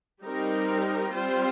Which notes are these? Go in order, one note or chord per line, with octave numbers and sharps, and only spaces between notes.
G3 C4 D#4 G4 A#4
G3 C4 F4 C5